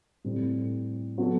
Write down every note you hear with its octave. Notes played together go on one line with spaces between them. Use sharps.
A2 G3 C4
F#3 B3 F#4 A4